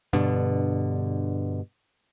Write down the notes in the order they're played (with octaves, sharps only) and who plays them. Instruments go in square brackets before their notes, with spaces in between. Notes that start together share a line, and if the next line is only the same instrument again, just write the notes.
[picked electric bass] G2 B2 D3